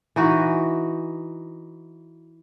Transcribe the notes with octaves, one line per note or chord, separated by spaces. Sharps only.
E3 D#4 F#4